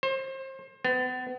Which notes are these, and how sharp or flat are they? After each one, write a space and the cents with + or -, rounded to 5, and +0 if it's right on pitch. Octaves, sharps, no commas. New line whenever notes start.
C5 +30
B3 +40